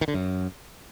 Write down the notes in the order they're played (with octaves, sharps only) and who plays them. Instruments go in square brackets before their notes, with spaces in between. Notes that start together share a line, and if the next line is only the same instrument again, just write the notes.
[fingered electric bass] D#3
D3
F#2